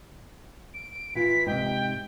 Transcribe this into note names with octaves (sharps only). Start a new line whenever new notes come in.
D7
E3 F4 B6
G#2 C3 D#4 G5